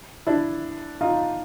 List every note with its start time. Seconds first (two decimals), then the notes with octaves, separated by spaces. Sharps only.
0.27 D4 E4
1.01 D#4 F4